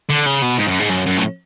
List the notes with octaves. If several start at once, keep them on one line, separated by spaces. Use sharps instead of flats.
D3
C#3
B2
G#2
F#2
G#2
F#2
F#2
A2